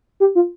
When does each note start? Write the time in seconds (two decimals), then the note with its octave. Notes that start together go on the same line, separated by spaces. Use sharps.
0.20 G4
0.35 F4